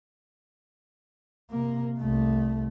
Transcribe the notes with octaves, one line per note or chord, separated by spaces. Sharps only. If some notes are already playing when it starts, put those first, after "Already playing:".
C3 A#3
C2 A3